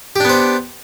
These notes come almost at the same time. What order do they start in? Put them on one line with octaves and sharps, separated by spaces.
G4 D4 B3 C5